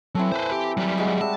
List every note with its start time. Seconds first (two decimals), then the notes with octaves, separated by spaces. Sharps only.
0.15 E3 F#3 C4 A4
0.32 B4 C5
0.51 G4
0.77 F#3 G3
0.98 G#3 F#4
1.21 G3 G4 E5 A5